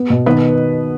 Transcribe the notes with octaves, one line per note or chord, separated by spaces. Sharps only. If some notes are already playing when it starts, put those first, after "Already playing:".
Already playing: B3
B2
D#3 B3 B4